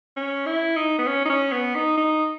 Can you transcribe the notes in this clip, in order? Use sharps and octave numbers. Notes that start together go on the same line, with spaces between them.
C#4
E4
D#4
B3
C#4
D#4
C#4
B3
D#4
D#4